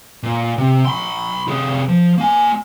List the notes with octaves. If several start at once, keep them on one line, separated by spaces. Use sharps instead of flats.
A#2
C3
B5 C6
C3 G#4
F3
A#3 G#5